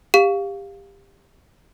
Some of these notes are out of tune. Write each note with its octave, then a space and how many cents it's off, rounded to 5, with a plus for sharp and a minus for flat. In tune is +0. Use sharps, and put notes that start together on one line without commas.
G4 +20 F5 +10